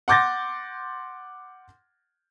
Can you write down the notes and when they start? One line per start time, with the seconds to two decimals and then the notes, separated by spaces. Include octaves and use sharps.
0.08 F#5 C6 D6 G6 A6 A#6